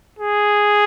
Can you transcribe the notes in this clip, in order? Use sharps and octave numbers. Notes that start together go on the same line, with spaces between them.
G#4